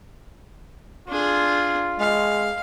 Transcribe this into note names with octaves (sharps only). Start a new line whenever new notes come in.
D4 F4 G#4
G#3 F5